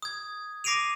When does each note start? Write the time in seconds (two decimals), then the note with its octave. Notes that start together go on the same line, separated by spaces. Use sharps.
0.02 D#6 G#6
0.64 D6 A#6 C7 D7 D#7 F7